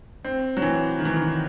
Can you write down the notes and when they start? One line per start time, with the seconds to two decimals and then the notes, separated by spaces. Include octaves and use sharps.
0.24 C4
0.57 F#3
0.62 E3
0.99 D#3
1.05 E3
1.13 D#3